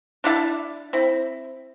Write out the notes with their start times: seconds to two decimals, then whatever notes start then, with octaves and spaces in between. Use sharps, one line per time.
0.24 D4 E4 F5 A5
0.93 C4 E4